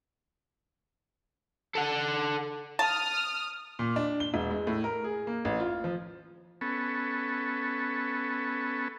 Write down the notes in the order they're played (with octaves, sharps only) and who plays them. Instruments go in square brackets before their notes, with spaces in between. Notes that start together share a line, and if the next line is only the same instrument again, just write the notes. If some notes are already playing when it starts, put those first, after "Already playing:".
[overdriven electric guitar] A4 F#5
[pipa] A5 [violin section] D#6 F6
[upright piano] A#2
D4
G7
E1
G#3
A2
A#4
G#4
A#3
A1
F4
F3
[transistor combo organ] B3 C#4 A4